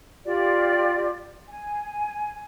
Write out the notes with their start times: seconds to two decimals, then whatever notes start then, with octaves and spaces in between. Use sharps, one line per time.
0.25 F4 G4 D5
1.48 G#5